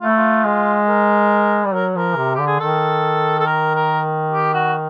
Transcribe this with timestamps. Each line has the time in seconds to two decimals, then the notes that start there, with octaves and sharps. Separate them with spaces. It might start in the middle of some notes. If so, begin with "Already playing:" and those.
0.01 A3 F4
0.09 E4
0.17 F4
0.45 G#3
0.88 A#4
1.66 G3
1.74 F#3 A#4
1.96 F3 A#4
2.16 C3
2.35 D3 G4
2.47 G#4
2.60 D#3 A4
3.39 A4
3.46 A#4
3.75 A#4
4.32 G4
4.54 F#4